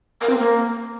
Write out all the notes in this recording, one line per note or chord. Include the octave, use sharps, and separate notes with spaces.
A#4
C4
A#3